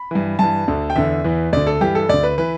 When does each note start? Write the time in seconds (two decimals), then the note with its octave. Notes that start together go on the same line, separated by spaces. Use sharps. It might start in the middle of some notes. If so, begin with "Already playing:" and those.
Already playing: B5
0.11 G2 E3
0.39 G2 E3 A5
0.68 D2 D3
0.90 G5
0.96 E2 D3 E5
1.24 E2 E3
1.53 D2 D3 D5
1.67 A4
1.81 G2 E3 G4
1.95 A4
2.09 D2 D3 D5
2.23 B4
2.38 E3 B4